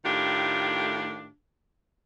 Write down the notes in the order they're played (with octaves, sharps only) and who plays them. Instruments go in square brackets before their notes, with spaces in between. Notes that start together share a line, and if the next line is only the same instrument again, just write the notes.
[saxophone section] A2 D#3 A3 D4 F4 G4